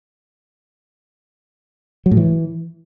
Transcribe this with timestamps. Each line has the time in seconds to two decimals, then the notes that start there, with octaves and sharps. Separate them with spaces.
2.06 F#3
2.11 A2
2.17 E3